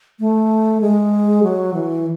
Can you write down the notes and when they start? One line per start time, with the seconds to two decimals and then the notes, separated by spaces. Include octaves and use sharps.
0.19 A3
0.81 G#3
1.43 F#3
1.74 E3